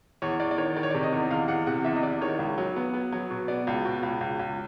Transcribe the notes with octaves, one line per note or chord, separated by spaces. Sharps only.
E2 C#5
E2 D5
D5
D#3 C#5
D#3 D5
C#5
C3 D5
D#5
E2
E2 F5
E2 F#5
C3 F#5
E2 E5
D#5
E2 D5
D#3 C#5
C#2
F#3
B3
B3
F#3
B2
B3 D5
C#2
B2
C#2
C#2
C#2